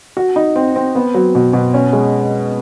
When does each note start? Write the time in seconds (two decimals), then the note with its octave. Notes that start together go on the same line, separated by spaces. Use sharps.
0.17 F#4
0.36 D#4
0.56 C4
0.76 C4
0.95 B3
1.14 F#3
1.35 B2
1.53 B2
1.74 C#4
1.93 G#3